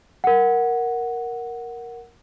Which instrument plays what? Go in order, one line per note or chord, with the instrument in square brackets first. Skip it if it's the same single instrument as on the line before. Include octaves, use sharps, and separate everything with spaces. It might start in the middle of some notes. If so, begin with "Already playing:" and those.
[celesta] A#4 F#5